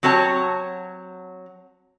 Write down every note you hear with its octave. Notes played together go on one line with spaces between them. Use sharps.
F#3 C4 F#4 C#5 A5